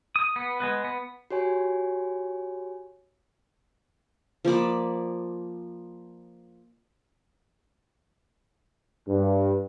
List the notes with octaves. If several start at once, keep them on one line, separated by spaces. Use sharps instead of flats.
D#6
B3
G#3 B3 B4
B3
F#4 G4 C#5 G#5
F3 A#3 D5 B5
G2